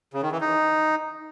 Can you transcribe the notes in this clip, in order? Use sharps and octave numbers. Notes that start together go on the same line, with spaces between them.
C#3
D#3
E3
D#4